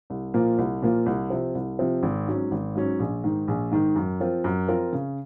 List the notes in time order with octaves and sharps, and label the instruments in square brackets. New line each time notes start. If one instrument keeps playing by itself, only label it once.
[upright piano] C2
A#2 F3 A#3 F4
C2
A#2 F3 A#3 F4
C2
C3 F3 C4
C2
C3 F3 C4
G#1
G#2 F#3 C#4
G#1
G#2 F#3 C#4
A#1
G#2 D#3
A#1
G#2 D#3
F#2
F3 C4 F4 A#4
F#2
F3 C4 F4 A#4
C#3